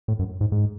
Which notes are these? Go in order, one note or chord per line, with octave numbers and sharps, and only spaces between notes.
A2
F#2
G#2
G#2